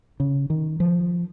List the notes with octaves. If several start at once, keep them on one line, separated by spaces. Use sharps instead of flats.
C#3
D#3
F3